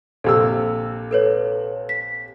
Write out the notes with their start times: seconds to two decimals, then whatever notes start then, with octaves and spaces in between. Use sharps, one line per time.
0.24 A#1 C3 A4 E6
1.11 A4 B4 C#5
1.89 B6